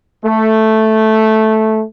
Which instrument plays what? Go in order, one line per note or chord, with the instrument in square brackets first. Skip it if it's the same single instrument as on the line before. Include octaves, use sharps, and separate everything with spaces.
[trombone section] A3